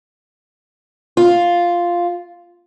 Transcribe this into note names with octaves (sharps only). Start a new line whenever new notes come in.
F4